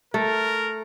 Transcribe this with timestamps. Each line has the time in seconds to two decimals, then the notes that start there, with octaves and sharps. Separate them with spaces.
0.14 A3 A#4